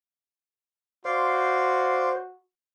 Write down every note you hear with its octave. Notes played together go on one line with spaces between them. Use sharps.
F#4 C5 D5 F5 C6